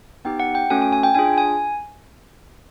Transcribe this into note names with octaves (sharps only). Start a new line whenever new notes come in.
B3 D#4 G4 G5
F#5
G5
A3 C#4 F#4 A4 G#5
G#5
G#5
G5
D4 F4 G#4 G#5
G#5